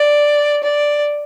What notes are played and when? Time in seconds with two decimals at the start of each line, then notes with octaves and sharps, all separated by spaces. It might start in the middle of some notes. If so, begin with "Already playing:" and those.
Already playing: D5
0.63 D5